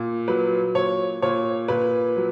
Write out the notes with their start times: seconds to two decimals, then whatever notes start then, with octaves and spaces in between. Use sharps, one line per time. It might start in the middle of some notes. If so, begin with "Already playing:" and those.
Already playing: A#2
0.28 F#3 B4
0.75 A#2 C#5
1.22 A#2 C#5
1.68 A#2 B4
2.16 F#3